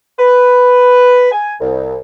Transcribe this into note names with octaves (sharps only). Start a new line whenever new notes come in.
B4
G#5
C2